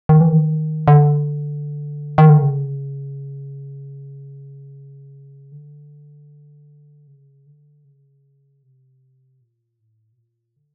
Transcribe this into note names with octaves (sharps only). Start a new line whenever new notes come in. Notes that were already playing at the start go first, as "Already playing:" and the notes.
D#3
E3
D#3
D3
D#3
D3
C#3
D3
C#3
D3
C#3
C3
A#2
A2
B2
A#2
D3